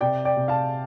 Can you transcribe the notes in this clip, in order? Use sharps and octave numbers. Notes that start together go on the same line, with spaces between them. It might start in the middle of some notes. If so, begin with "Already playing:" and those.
C3 D5 G5
D5 G5
C3
F5 A5